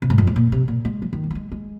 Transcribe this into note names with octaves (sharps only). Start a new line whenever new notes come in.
C3
G#2
F2
G#2
A#2
C3
A#2
G#3
F3
D#3
G#3
A#3
G#3
G#3